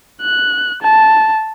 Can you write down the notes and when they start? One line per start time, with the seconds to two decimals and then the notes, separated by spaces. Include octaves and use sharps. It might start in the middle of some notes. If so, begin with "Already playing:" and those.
0.22 F#6
0.82 A5